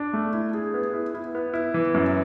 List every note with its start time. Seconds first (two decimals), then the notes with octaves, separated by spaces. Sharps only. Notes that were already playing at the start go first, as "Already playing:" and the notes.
Already playing: D4
0.13 A3
0.33 E4
0.54 G#4
0.74 B3
0.94 E4
1.14 E4
1.35 B3
1.54 E4
1.74 E3
1.94 F#2